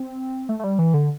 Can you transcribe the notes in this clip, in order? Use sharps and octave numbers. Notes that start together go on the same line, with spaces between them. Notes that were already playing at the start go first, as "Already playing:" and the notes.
Already playing: C4
A3
A3
G3
E3
D3